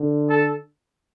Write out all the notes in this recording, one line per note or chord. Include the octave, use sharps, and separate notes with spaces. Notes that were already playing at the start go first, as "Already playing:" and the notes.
Already playing: D3
A4